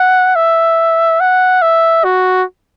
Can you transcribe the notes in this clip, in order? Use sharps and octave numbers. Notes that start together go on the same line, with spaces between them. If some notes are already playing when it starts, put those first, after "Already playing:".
Already playing: F#5
E5
F#5
E5
F#4